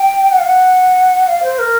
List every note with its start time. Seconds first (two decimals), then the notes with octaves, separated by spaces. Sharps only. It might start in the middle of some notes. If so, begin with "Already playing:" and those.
Already playing: G5
0.31 F#5
0.38 F5
0.46 F#5
1.27 F5
1.43 C5
1.58 A#4